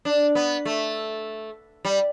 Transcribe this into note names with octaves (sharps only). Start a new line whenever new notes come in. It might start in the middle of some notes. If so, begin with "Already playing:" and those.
D4
B3
A3
G3